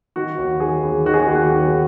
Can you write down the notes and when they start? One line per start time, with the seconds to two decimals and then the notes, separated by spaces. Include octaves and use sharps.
0.16 D#3 F#4
0.38 D#2
0.60 D#3 G#4
0.83 D#2
1.05 D#3 F#4
1.14 G#4
1.20 F#4
1.28 D#2 G#4
1.35 F#4
1.50 D#3